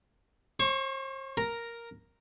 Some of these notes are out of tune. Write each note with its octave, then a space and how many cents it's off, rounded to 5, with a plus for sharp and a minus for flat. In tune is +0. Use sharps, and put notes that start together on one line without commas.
C5 +40 C#6 +0
A#4 +0 A#5 +0